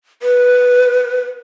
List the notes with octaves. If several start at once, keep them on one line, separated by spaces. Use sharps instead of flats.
B4